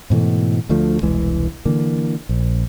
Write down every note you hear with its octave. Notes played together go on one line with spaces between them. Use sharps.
G#2 B2 E3 A3
D2 D3 F3 A3
E1 C2 E3 G#3
D3 E3 A#3
A#1